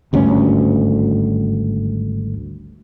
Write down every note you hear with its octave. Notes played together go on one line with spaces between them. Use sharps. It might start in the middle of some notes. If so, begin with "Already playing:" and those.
G#1 D2 G2 C#4